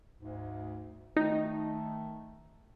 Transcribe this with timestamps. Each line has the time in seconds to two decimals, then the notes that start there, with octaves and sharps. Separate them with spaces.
0.20 D2 G#2
1.16 D#3 A3 D#4